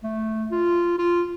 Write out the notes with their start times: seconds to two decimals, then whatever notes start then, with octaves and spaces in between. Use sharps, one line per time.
0.04 A3
0.51 F4
0.98 F4